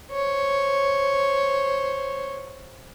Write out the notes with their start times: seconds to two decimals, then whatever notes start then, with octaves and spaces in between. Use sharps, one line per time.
0.12 C5 C#5